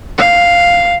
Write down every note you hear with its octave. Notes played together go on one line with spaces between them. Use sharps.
F5